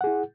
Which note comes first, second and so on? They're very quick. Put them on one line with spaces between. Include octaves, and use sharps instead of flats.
F#5 G#4 E4